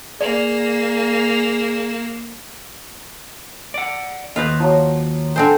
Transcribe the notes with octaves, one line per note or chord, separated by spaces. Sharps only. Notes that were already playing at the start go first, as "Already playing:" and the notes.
A#3 G#4 D5 E7
D5 F#5
D#2 F4 B4 C5 D#5
F3 F#3 D6
D3 C4 C5 G#5 A5 C6